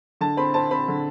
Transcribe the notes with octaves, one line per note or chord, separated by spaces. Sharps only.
D3 A5
C4 B5
C4 A5
C4 B5
D3